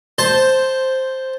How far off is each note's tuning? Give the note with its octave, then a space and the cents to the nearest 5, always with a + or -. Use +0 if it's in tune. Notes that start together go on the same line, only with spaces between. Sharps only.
C5 +0 A5 +0